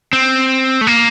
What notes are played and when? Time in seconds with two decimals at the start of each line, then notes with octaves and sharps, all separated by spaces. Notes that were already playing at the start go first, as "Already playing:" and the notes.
0.13 C4
0.81 A3
0.87 A#3